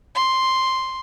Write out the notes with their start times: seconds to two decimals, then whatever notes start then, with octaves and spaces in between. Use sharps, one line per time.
0.15 C6